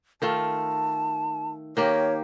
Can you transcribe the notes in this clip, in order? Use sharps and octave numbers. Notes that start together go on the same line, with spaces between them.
D#3 A3 F4 A5
D#3 A#3 G4 C#5